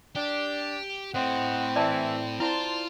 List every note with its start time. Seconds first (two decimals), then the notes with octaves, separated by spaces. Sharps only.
0.15 D4 G4
1.14 A2 C4 C5 D#5 F#5
1.76 E3 D5 A5
2.40 E4 F4 C5 D5 A5